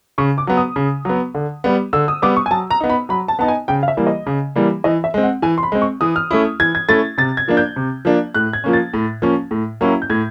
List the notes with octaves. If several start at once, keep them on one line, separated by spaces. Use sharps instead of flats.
C#3 C#6
D6
F#3 B3
D#6
C#3
F#3 B3
D3
G3 B3
D3 E6
D#6
G3 B3 D6
C#6
G#5
F#3 A5
A#5
B3 D#4
B5
F#3 B5
A5
B3 D#4 A5
G#5
C#3 G5
F5
E5
E3 G3 A#3
D#5
C#3
E3 G3 A#3
E3 D#5
E5
G#3 C4
F#5
E3 G#5
C6
B5
G#3 C4
C#6
E3 D#6
F6
A3 C#4 E4
E3 G#6
G#6
A3 C#4 E4 A6
C3 A6
G#6
F3 A#3 D4
G6
C3
F3 A#3 D4
A2 F#6
G#6
F3 A#3 C#4
A6
A2
F3 A#3 C#4
A2
F#3 A#3 C#4 E4
G6
A2 G#6